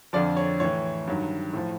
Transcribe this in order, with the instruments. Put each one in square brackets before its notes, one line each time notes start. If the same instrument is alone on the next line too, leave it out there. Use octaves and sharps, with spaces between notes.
[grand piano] F2 D3 F3 D5
C#5
A2 E3 C#5
G2 D#3 F#3
A2 F3